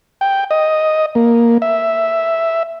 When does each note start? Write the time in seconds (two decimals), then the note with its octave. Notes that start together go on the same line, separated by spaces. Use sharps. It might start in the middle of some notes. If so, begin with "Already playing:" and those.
0.21 G5
0.51 D#5
1.15 A#3
1.62 E5